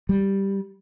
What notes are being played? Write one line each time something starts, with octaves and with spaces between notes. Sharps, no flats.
G3